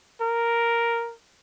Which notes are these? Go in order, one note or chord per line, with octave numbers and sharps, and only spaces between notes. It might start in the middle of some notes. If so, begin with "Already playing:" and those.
A#4